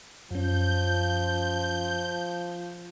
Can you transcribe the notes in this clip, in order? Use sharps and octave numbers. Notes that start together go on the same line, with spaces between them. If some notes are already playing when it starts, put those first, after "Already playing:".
F#2 F3 C#4 G6